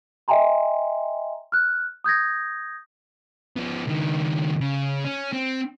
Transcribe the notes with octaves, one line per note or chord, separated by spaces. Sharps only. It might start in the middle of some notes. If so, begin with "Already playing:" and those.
D#5 E5 G5 G#5 A#5 C6
F6 F#6
D#6 G6 G#6 A#6
F3 B3
C#2 D#3
C#3
C#4
C4